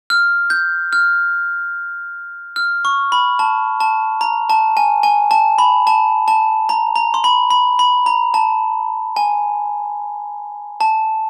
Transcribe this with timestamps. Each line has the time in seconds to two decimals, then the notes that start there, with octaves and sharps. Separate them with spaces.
0.10 F6
0.50 G6
0.93 F6
2.56 F6
2.85 C#6
3.12 B5
3.39 A5
3.80 A5
4.21 A#5
4.50 A5
4.77 G#5
5.03 G#5
5.31 A5
5.58 B5
5.87 A5
6.28 A5
6.69 A#5
6.96 A#5
7.14 C6
7.24 B5
7.50 B5
7.79 B5
8.06 A#5
8.34 A5
9.16 G#5
10.81 A5